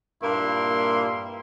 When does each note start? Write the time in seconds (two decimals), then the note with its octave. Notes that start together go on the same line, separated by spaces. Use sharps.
0.23 G2 A#2 A#3 E4 C6